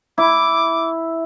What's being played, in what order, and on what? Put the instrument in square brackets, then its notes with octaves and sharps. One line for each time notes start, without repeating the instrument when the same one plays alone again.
[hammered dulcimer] E4 [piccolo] D6